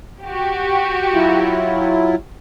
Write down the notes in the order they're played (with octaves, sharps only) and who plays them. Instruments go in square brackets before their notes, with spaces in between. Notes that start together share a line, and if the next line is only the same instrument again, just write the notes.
[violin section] F#4 G4
[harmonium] F#3 E4 F4